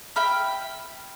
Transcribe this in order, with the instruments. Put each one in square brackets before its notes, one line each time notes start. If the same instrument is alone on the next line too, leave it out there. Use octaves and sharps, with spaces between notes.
[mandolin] E5 G5 B5 F6